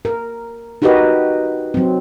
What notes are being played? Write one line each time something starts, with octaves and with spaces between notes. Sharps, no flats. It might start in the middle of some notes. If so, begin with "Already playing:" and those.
A#4
D#4 F#4 G4 A#4 B4 D#5
F#3 C4